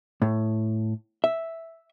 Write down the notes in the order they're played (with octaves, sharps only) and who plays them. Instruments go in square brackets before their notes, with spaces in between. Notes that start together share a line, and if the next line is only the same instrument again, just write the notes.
[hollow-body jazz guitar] A2
E5